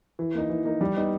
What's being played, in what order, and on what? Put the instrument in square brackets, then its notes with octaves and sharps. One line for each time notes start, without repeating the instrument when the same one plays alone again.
[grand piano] E3
A#3 D#4
E3
A#3 D#4
G3
B3 D#4